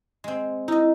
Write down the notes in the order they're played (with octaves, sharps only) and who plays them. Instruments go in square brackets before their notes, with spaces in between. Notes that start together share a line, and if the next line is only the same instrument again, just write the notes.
[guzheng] G#3 C4
[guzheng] D#4 D#5 [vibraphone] E4